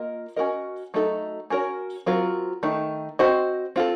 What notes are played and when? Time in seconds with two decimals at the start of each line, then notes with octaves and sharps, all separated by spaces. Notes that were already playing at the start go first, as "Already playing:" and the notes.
Already playing: A#3 F4 A#4 D#5
0.36 C#4 F#4 A#4 D#5
0.94 F#3 A3 D#4 A4
1.50 C#4 F#4 A#4 C#5
2.06 F#3 C4 F4 A#4
2.63 D#3 A3 D#4
3.19 C4 F#4 C5 D#5
3.76 C4 F4 A4